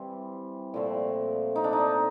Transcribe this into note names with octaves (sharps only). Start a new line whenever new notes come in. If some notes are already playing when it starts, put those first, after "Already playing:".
Already playing: E3 G3 C4
A#2 F3 A3 C4
D#4
D4
D#4